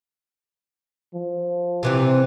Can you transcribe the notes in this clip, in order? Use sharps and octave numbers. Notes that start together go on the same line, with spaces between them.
F3
C3 E3 G3